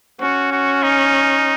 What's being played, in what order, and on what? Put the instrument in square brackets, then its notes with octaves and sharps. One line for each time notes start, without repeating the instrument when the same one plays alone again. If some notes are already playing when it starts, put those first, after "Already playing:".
[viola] C#4 [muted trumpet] F#4
[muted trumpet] F#4
D#4